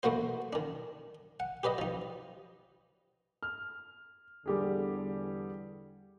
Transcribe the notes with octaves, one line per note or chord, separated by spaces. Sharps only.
E2 A3 A#3 F#4 C5
D#3 D4
F#5
G4 B4 D5 D#5
F3 D#4
F6
E2 D3 G3 G4 G#4